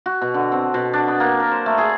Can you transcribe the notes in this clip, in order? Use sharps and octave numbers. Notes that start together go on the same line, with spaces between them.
F#4
B2
D3
C4
B2
D4
B3
A#3
A#4
C5
A3
G#4